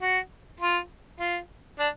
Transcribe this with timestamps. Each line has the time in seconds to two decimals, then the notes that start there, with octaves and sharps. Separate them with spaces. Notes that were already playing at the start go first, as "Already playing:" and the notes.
0.01 F#4
0.60 F4
1.19 F4
1.79 D4